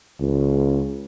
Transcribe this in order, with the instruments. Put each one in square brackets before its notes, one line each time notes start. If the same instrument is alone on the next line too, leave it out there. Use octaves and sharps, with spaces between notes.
[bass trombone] C#2